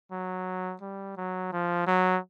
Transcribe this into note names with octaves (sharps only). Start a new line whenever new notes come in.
F#3
G3
F#3
F3
F#3